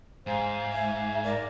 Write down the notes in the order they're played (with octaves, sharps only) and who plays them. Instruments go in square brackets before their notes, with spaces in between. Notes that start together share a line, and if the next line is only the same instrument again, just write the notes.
[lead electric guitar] G#2 [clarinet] C5 [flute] F5 [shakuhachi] G#5
[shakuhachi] E5 [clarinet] G#5
[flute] A#4 [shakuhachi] D5